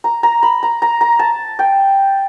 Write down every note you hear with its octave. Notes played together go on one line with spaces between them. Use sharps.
A#5
A#5
B5
A#5
A#5
A#5
A5
G5